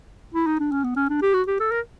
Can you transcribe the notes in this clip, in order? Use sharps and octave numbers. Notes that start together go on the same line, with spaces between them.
E4
D#4
D4
C#4
B3
C#4
D4
G4
F#4
G4
A4
A#4